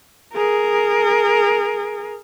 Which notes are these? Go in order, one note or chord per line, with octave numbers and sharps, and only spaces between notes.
G#4 A#4